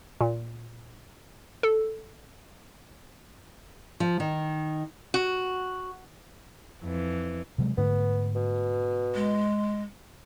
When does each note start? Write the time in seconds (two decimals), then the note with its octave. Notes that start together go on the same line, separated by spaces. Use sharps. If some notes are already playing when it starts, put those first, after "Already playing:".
0.21 A#2
1.63 A4
4.00 F3
4.20 D#3
5.14 F#4
6.81 F2 E3
7.58 C3 F#3 G#3
7.78 G#2 D3 A3 B3
8.35 B2
9.15 G#3